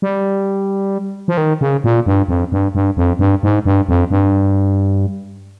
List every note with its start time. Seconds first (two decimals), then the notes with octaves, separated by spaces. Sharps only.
0.02 G3
1.28 F3
1.37 D#3
1.61 C#3
1.84 A#2
2.06 G2
2.28 F2
2.52 G2
2.75 G2
2.97 F2
3.19 G2
3.43 G#2
3.65 G2
3.89 F2
4.11 G2